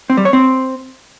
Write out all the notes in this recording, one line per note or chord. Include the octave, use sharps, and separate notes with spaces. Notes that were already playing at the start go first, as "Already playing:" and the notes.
C4
G3
C#5
C4